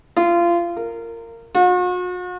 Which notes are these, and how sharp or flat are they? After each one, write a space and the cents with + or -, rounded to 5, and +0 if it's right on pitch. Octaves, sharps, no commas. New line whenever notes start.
F4 -25
A#4 -20
F#4 -45